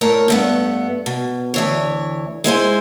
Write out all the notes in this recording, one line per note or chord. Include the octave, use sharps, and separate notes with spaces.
A2 A#4 C#5
G2 A3 B3
B2
D2 E3 C#5
G#3 E4 C5 G#5